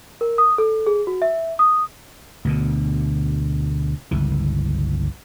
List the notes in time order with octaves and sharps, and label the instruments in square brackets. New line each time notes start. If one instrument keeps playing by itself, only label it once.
[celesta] A#4
D#6
A4
G#4
F#4
E5
D#6
[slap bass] D2 B2 D3
G1 C#2 E3